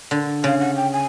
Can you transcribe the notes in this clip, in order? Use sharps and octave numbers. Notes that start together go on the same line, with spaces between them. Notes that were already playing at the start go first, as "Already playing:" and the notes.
D3
C#3 F5
F#5
G5
G#5